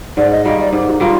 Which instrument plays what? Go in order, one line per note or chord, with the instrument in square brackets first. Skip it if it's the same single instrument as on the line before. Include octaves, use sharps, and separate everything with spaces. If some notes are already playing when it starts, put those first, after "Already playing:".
[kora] G#2 [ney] D5
[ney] D#5
[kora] D#3 G3 A#3 [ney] D#5
[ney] D5
[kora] G#2 [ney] G4
[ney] D#4
[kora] D#3 G3 A#3 [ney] F4